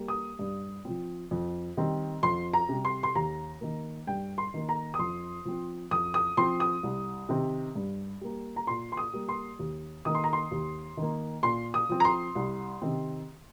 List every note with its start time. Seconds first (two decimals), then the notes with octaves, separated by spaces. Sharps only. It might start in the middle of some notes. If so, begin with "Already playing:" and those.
Already playing: G3 A#3
0.08 D#6
0.39 G2
0.85 F3 C4
1.31 F2
1.77 D#3 G3 C4
2.23 F2 C6
2.53 A#5
2.69 C3 G3
2.85 C6
3.03 C6
3.15 D#2 A#5
3.61 D#3 A#3
4.07 G2 G5
4.38 C6
4.54 D#3 A#3
4.69 A#5
4.94 D#6
4.99 F2 C6
5.45 F3 C4
5.91 F2 D#6
6.14 D#6
6.37 F3 C4 C6
6.60 D#6
6.83 C2
7.29 C3 D#3 C4
7.75 G2
8.21 G3 A#3
8.56 A#5
8.67 A#2 C6
8.92 C6
8.97 D#6
9.13 G3 A#3
9.29 C6
9.59 D#2
10.05 D#3 A#3 D#6
10.15 C6
10.24 A#5
10.33 C6
10.51 D#2
10.97 D#3 A#3
11.43 A#2 C6
11.74 D#6
11.89 F3 C4
12.00 A#5
12.05 C6
12.35 C2
12.82 C3 D#3 C4